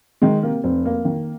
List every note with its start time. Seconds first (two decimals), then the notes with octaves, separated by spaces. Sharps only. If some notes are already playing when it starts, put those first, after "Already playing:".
0.22 D#3 G#3
0.43 C3 A#3
0.64 F1 C4
0.85 F2 A#3
1.05 D#3